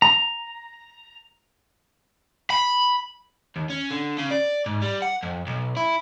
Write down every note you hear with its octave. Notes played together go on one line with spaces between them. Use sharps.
A#5
B5
D#2
C#4
D3
C#3
D5
G#2
G3
F#5
F2
B1
E4